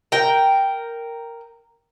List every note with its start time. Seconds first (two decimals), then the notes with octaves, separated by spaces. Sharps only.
0.12 A#4 G5